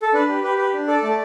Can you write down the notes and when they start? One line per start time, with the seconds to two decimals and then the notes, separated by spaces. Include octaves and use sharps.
0.02 A4
0.13 D4 B4
0.29 G4
0.43 G4 B4
0.58 G4 B4
0.74 D4
0.88 A4 D5
1.03 A3 D5